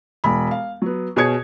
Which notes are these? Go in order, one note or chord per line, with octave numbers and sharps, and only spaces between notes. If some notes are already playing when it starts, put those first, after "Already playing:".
E1 B5
F5
F#3 B3
B2 G#4 C#5 G#6 C#7